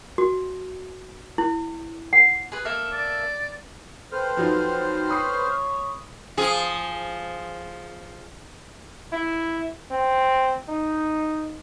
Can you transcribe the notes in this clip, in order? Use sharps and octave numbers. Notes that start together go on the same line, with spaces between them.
F#4
E4
F#5
G#4 B4
A#3 A4 E5
D5
C4 A4 B4 C5 F6
F3 F#3 D#4
C#5 B5 D#6 C7
F3 G#4
E4
C4
D#4